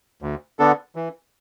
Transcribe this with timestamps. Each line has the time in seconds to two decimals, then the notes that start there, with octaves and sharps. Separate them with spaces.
0.22 D2
0.59 D3 B3 D4 A4
0.96 E3